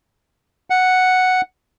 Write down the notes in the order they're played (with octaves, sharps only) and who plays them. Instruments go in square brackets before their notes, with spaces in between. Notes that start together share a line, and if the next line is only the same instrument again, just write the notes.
[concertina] F#5